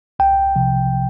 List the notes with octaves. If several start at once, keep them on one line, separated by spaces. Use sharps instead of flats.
C2 G5
C3 F3